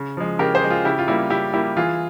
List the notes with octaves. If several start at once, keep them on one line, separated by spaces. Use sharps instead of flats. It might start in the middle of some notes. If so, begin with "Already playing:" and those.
Already playing: C#3
F3 G#3
C#3 G4 A#4
G#4 C5
F3 G#3
F4 G#4
C#3 E4 G4
F4
G3 A#3 E4
C#3 E4 G4
G3 A#3 E4 G4
E3 F4 G#4